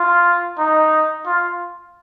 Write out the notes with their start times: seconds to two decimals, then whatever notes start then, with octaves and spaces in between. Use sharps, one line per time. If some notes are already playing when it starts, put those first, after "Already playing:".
Already playing: F4
0.58 D#4
1.26 F4